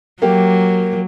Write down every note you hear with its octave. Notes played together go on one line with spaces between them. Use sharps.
F#3 A#3 G4